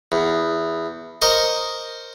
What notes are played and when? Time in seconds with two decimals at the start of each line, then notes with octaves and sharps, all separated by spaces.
0.12 E2
1.22 A#4 C5 D#5 C#6